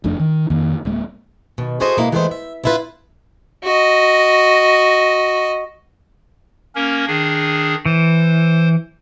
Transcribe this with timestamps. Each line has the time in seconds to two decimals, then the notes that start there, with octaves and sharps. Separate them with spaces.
0.04 F#1 F2 A3 D4
0.19 D#3
0.50 F2 D#3 A#3
0.85 D1 G#3 A#3
1.58 B2 D#3
1.80 E4 F#4 G#4 A4 C5 D#5
1.97 B2 G#3 A#3 E4
2.12 E3 G#3 A3 B3 C4 C5
2.31 E5
2.64 B3 D4 E4 F4 B4
3.64 F#4 D#5
6.75 A#3 C#4 A#4
7.07 D#3 D4 G#4
7.86 E3 C5